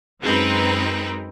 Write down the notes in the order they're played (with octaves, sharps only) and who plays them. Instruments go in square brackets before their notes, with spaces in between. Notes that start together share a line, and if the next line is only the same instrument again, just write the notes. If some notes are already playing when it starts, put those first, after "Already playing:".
[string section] F#2 G#3 C4 D#4 A#4 B4